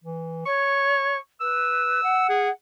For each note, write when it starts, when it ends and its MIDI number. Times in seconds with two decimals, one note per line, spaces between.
0.04 0.43 52
0.46 1.17 73
0.46 1.18 85
1.41 2.01 71
1.41 2.25 88
2.03 2.50 78
2.29 2.50 68